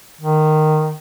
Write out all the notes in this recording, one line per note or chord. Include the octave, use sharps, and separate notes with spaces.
D#3